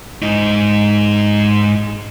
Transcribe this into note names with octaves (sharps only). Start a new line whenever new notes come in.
G#2 D#4